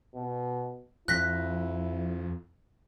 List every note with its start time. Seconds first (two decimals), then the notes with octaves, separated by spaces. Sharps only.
0.14 B2
1.08 F2 E4 F#6 A#6 B6